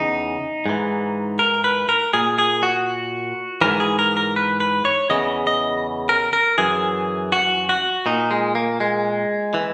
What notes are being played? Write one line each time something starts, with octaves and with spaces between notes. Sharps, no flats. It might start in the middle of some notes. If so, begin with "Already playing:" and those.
Already playing: E2 C#3 E3 D#4
G#2 E3
A#4
B4
A#4
A#2 G#4
G#4
F#4
G#2 E3 A#4
G#4
A#4
A#4
B4
B4
C#5
E2 C#3 E3 D#5
D#5
A#4
A#4
F#2 E3 G#4
F#4
F#4
A#2 D#4
G#3
A#3
G#3
E3